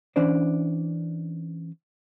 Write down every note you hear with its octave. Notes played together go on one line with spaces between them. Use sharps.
E3 C#4 D4 C5 D5